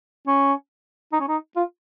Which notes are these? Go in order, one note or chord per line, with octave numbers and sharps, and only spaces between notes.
C#4
D#4
C#4
D#4
F4